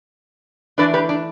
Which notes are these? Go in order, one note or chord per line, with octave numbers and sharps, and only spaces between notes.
E3 A3 D4 B4 D5
G4 B4
D4